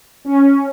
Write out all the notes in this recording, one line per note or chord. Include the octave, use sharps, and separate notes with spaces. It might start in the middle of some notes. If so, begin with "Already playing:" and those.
C#4